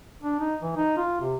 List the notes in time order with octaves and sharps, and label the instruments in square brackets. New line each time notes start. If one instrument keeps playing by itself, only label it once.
[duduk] D4
D#4
E3
D#4
F4
C3